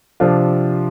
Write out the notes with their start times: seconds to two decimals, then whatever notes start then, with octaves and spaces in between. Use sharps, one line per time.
0.20 C3 F3 D4 F4